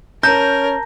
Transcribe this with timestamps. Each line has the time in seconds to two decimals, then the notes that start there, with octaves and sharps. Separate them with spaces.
0.23 C#4 A#4 A5 A#5 G6 A#6